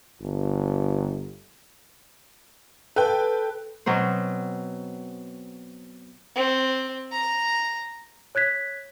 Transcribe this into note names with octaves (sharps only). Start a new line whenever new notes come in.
G1
A4 B4 G5
B2 F#3 C4 C5
C4
A#5
C#5 F#6 G#6 B6